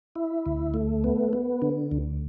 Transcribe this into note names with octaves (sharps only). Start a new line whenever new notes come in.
E4
D2
A3
B3
B3
D3
D2